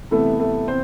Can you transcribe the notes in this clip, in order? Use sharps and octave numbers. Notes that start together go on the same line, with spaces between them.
C3 E3 A3 B3 A4
A3 A4
C4 C5